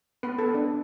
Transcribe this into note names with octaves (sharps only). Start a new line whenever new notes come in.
B3 B4
A4
B3
D4